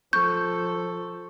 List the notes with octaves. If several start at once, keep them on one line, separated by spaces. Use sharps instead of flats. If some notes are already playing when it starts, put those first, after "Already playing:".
F3 A4 C#6 G6